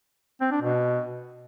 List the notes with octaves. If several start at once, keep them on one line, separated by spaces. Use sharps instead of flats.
C4
D4
B2